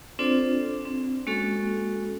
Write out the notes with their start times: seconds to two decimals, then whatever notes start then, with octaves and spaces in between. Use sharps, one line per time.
0.19 C4 D4 F4 A4 C5 D5
0.85 C4
1.27 G#3 A#3 C#4 F#4 A4